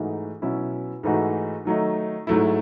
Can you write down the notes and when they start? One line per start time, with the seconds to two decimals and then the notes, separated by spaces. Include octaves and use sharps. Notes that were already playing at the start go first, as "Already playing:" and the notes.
Already playing: G#2 E3 A3 D#4 F#4
0.42 B2 F#3 C#4 E4
1.03 G#2 E3 A3 D#4 F#4
1.65 D#3 F#3 A3 D#4
2.27 G#2 F#3 A3 E4